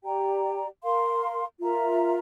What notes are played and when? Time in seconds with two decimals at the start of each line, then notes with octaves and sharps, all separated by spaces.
0.04 G4 D5 G5 A#5
0.82 A#4 F5 C6
1.60 F4 A#4 E5 A#5